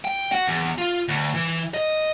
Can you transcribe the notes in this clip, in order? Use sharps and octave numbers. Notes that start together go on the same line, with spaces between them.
G5
F#4
E2
F4
D2
E3
D#5